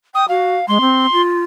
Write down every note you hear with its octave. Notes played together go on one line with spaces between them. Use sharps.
G5 D#6
F#4 F5
G#3 C6
C4
F4